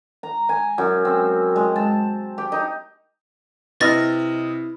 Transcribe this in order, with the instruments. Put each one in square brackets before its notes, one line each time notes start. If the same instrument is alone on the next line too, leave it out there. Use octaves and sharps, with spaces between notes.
[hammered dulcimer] A#5
G#5
F#2
C4
G#3
A5
G4
D#4
[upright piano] C3 D#5 F6 [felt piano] E4 [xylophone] B4 A6 A#6